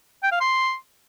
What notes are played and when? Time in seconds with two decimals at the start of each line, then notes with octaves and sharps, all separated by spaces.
0.23 G5
0.32 F5
0.41 C6